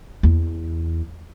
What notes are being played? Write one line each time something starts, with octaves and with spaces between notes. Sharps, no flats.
E2